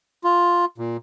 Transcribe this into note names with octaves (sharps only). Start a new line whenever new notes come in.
F4
A#2